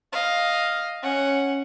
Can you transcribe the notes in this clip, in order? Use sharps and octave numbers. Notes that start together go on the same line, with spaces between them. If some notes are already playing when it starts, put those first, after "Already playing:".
D#5 F5
C#4 F#5